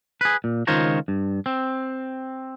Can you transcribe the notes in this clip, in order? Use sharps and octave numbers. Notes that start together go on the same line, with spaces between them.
G#4 B4
A#2
C#2 D#3 F4 C5 C#5 A#5
G2
C4